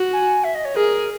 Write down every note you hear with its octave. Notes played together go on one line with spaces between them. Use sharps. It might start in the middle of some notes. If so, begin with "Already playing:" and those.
Already playing: F#4
G#5
E5
D#5
C#5
G#4 A#4